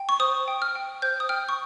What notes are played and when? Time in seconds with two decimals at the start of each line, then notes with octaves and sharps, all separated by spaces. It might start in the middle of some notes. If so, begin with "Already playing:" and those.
Already playing: G5
0.09 C#6
0.20 C5 D#6
0.48 G5
0.62 F6
0.75 G5
1.02 C5 G6
1.20 D#6
1.29 G5 F6
1.49 C#6